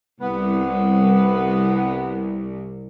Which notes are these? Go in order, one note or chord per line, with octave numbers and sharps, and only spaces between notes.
C2 B3